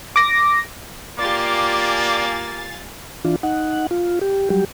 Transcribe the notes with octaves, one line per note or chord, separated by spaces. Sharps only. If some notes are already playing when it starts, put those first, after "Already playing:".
D6 A#6
A#3 F4 G4 D5 F5 G#5 A6
E3 D4 F4
D#4 F#5
F4
G4
F#3 G3 G4